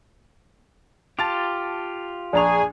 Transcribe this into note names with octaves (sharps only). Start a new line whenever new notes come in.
F4 G4 A5 A6 F7
A#1 D4 G#4 D5 G#5 A#5 C#6 F7